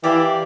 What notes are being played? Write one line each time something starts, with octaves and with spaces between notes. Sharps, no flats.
E3 G4 A#4 D5 F5